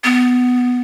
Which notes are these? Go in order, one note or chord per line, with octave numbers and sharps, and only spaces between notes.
B3